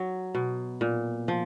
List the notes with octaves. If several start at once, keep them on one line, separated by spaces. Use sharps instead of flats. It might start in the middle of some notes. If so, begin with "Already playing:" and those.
Already playing: F#3
B2
A#2
F3